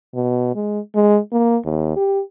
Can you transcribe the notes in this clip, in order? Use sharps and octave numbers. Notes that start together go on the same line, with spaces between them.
B2
G#3
G#3
A#3
D#2
G4